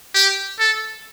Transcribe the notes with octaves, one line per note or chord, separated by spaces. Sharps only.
G4
A4